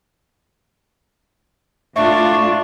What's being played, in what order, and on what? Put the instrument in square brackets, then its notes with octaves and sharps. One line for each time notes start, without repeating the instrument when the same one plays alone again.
[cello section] A2 F4 [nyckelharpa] D4 [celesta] E5 [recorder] C#6